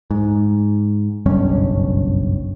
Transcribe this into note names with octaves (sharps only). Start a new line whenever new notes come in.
G#2
F#1 B1 G2 C#4